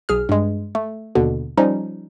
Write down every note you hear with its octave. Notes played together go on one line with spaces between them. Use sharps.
B1 G#4 F6
G2 G#3
A3
D#2 B2 D3
F3 G3 C#4 D#4